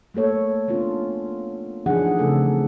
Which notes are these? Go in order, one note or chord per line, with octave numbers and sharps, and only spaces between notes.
A3 A#3 A4 C#5
B3 C#4 D4 F4
E3 F3 D4 D#4 G#4 F#5
C#3 A3 C4 A4